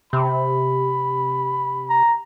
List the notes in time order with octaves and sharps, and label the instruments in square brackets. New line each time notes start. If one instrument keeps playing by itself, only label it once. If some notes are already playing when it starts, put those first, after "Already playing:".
[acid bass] C3 [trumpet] B5
[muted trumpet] A#5